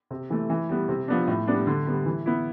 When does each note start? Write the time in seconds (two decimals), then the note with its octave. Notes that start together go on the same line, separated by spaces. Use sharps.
0.11 C3
0.30 E3 A3
0.50 E3
0.69 G3 B3
0.89 C3
1.08 F3 B3 D4
1.28 A2
1.48 G3 B3 D4
1.67 D3
1.86 G3 B3
2.06 E3
2.26 B3 E4